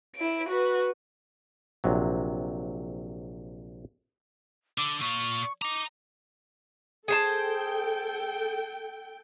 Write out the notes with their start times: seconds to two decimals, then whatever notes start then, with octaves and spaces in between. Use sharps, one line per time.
0.16 E4 D7
0.49 F#4 B4
1.84 A#1 C3 F#3
4.78 D3 D6
5.01 A#2 F4 C#6
5.62 D#5 A#5 D6
7.08 G#4 A4 C5 G5 A5